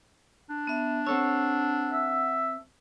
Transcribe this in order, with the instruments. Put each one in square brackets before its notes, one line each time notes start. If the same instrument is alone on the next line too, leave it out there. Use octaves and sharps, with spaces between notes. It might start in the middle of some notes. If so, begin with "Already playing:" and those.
[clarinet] D4
[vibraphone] B3 E5
[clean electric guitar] C4 A4 C#5 [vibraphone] F#5 E6
[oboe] E5